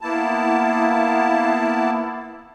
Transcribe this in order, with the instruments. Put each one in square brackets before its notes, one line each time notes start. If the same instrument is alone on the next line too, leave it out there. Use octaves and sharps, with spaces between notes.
[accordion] A#3 B3 E4 A5